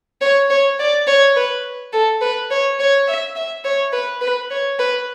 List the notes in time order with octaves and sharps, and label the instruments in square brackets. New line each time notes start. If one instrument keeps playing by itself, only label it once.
[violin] C#5
C#5
D5
C#5
B4
A4
B4
C#5
C#5
E5
E5
C#5
B4
B4
C#5
B4